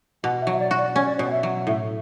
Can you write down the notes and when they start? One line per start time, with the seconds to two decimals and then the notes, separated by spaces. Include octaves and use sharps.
0.24 B2 F#5
0.41 E5
0.47 F#3
0.53 E5
0.60 D5
0.71 F#4
0.78 D5
0.95 C#4 C#5
1.05 D5
1.16 C#5
1.19 B2
1.27 F#5
1.31 E5
1.43 F#3
1.67 A2 E5